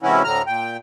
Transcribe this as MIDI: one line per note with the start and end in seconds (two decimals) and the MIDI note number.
0.03 0.22 44
0.03 0.22 48
0.03 0.22 52
0.03 0.22 61
0.03 0.22 64
0.03 0.22 66
0.24 0.42 38
0.24 0.42 45
0.24 0.42 50
0.24 0.42 82
0.24 0.42 89
0.47 0.77 46
0.47 0.77 79